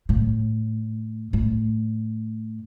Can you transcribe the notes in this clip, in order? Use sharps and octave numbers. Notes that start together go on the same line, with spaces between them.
A2
A2